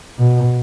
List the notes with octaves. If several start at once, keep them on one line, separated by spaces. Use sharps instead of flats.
B2